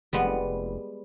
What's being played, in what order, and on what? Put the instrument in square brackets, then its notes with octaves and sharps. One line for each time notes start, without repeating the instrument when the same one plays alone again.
[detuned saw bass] F1 [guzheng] G3 G#3 B3